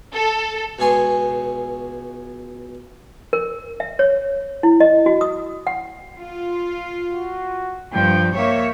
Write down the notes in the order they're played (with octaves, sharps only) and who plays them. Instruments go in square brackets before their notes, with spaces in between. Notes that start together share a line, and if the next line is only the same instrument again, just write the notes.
[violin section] A4
[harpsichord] C#2 B2 C#5 G#5 C6
[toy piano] A#4
E5
C#5
E4
D#5
F#4
D#6
F#5
[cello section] F4
[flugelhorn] F#4
[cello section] G2 F3 [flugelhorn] G5
[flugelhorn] A#3 [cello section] C#5 E5